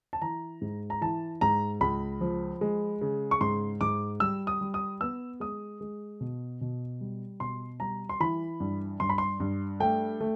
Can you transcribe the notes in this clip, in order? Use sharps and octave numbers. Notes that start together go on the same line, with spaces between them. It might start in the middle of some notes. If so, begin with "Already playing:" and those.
A5
E3 A#5
G#2
A#5
E3 A5
G#2 A#5
C#2 B5
F3
G#3
C#3
C#6
G#2 C6
G#2 D6
G3 E6
D#6
G3
D#6
B3 E6
G#3 D#6
G#3
B2
B2
G3
B2 C6
G3 A#5
C6
E3 B5
G2
G2 C6
B5
C6
G2
A3 G5
A3